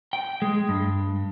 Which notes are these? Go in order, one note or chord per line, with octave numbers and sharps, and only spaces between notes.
G5
G#3
G2